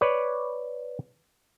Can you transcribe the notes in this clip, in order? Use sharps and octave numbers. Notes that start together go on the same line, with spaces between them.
B4 C#5 D5